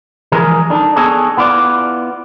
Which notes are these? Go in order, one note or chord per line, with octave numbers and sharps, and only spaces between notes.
E3 F3 G#3 G#4 A#4
D4 D#4 A4
B3 D4 G#4 A4 C#5 D#5
B3 E4 F4 D5